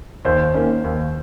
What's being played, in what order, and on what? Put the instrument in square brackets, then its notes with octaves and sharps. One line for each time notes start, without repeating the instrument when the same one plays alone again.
[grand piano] D#2 [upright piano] C5
[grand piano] D#3 A#3 C#4
D#2